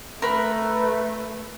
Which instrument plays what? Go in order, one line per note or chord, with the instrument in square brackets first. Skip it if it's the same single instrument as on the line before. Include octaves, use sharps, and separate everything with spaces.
[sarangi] A3 [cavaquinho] A#4 B5 [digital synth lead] B4